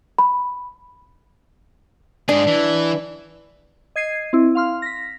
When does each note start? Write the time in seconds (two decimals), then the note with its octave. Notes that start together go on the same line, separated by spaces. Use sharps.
0.19 B5
2.29 G#2 D4 G#4
2.47 E3
3.96 D#5 G#6 C7 D#7
4.33 C4 E4
4.55 F5 C6 F6
4.82 A#6 B6